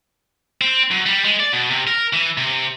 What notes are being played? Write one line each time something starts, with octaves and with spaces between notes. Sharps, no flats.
C4
F#2
G3
G#3
D5
B2
C3
A#4
E3
C3